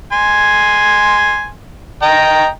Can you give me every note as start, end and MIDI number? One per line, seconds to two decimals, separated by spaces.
0.12 1.49 80
0.12 1.49 84
2.02 2.48 75
2.02 2.48 79
2.02 2.48 82